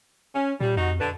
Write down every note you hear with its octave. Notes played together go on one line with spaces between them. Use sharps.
C#4
A#2 G3
F2 D#4 F#4
D3 D4 B4